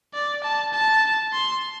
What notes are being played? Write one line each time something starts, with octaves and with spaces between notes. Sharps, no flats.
D5
A5
A5
C6